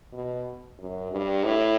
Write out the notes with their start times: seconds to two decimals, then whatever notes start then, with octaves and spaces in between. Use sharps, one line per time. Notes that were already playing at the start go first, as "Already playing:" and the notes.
0.13 B2
0.79 F#2
1.12 G2
1.44 A2